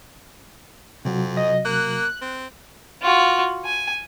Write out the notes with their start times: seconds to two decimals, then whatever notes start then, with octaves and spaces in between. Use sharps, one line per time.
1.05 F2 C3 F#3 F#4
1.37 D#5
1.65 A#3 F#6
2.21 C4
3.02 F4 F#4
3.65 G#5